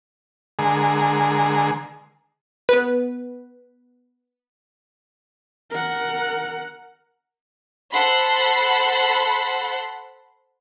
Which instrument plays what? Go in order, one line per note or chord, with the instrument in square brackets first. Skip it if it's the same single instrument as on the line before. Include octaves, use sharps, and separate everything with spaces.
[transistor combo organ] D3 G#3 G#4 A#4
[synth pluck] B3 B4
[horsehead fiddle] A#4 F#5
[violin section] A4 C5 F#5 B5 C6